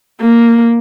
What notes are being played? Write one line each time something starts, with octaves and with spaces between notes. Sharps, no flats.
A#3